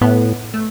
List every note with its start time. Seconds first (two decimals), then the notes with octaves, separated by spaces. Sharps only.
0.01 A2 B3
0.54 A3